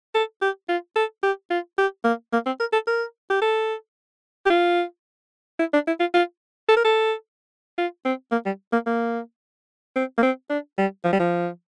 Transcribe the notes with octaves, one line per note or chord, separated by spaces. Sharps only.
A4
G4
F4
A4
G4
F4
G4
A#3
A#3
C4
A#4
A4
A#4
G4
A4
G4
F4
E4
D4
E4
F4
F4
A4
A#4
A4
F4
C4
A#3
G3
A#3
A#3
C4
A#3
C4
D4
G3
F3
G3
F3